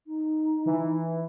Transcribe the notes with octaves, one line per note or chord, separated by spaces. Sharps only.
D#4
E3